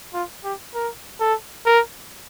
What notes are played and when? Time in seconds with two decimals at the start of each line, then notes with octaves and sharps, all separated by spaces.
0.14 F4
0.44 G4
0.74 A#4
1.20 A4
1.66 A#4